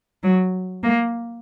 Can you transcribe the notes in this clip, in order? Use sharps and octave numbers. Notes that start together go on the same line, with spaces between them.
F#3
A#3